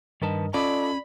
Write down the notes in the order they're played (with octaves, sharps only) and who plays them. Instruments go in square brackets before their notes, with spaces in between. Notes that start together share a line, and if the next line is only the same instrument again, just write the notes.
[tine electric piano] G2 A#4 D#5 [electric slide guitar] D#3 B4 A5
[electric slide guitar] C#4 [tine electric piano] F4 A4 D#5 [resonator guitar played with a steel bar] D5 [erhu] B5